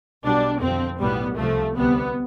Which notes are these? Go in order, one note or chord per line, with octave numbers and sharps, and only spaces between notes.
B1 B2 G3 D4
F2 D3 F3 C4
B1 A2 G3 B3
C2 C3 F3 A3
D2 C3 G3 B3